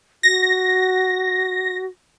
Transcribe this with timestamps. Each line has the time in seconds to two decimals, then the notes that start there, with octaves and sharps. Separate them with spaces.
0.23 F#4 A#6